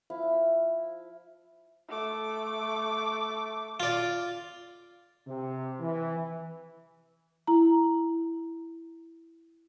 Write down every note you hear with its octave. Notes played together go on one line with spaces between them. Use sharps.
F3 E4 F5
A3 D6
F4 D5
C3
E3
E4 A#5